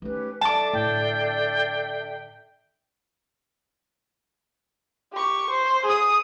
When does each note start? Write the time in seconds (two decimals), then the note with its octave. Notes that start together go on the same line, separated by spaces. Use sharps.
0.02 A3 C#4 D#4 G4 B4
0.41 F#3 D4 A4 E5 A5 D6
0.73 A2 D3 G5
5.13 G4 C#6
5.49 C5
5.86 G#4 D#6